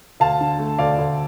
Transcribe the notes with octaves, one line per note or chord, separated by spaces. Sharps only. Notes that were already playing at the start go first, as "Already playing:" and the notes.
D2 F5 A5
D3
A3
D2 D5 F5
D2